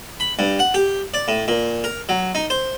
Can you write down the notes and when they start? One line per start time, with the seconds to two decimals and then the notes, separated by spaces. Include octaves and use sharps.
0.20 B5
0.39 G2
0.59 F#5
0.74 G4
1.14 D5
1.28 A2
1.48 A#2
1.84 A#4
2.09 F#3
2.35 D#4
2.50 C5